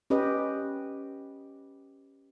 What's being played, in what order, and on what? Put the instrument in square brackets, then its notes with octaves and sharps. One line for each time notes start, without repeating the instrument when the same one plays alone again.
[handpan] C#4 G4 B4 D#5